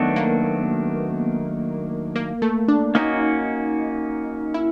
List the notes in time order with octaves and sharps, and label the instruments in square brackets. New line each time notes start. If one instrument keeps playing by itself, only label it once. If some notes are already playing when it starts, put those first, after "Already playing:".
Already playing: [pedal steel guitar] D#3 F#3 A3 D4 F#4 [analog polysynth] B3
[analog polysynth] A#3
A#3
A3
D4
[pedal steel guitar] A#3 C#4 F#4 [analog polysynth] D#4
[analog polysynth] E4